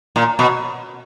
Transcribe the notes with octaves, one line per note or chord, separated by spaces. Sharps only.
A#2
B2